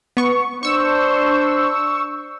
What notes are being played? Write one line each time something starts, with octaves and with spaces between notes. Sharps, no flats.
B3 C#6
D4 C5 C#6 E6